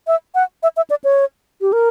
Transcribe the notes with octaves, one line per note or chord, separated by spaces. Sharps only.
E5
F#5
E5
E5
D5
C#5
G4
A#4